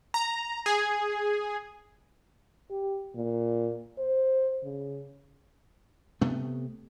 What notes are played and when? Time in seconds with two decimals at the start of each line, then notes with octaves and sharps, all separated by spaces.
0.14 A#5
0.66 G#4
2.71 G4
3.15 A#2
3.98 C5
4.64 C#3
6.21 C3 A3 B3